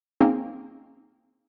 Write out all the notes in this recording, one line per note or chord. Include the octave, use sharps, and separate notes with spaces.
A#3 C4 C#4 D#4 G#4